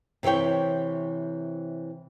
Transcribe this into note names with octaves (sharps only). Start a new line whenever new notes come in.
C3 E3 G4 C#5 G5